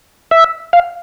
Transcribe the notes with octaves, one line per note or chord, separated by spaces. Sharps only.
E5
F5